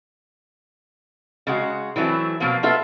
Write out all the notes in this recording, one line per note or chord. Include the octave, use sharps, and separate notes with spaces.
C#3 G#3 F#4
E3 F#3 A3 C4 E4
B2 F3 F#3 A#3 C4
A#3 B3 F4 A4 E5